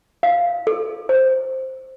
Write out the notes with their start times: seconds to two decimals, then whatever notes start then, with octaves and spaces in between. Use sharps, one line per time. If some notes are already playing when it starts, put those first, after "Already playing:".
0.23 F5
0.67 A4
1.09 C5